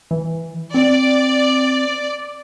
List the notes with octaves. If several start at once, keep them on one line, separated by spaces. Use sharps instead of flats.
E3
C4 D5